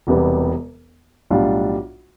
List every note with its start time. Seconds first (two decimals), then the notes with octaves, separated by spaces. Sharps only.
0.07 E1 E2 C3 G3 B3
1.30 B1 A2 G3 D4 F4